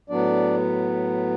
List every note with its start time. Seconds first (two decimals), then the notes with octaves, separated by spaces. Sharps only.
0.09 A2 F#3 B3 D4 D5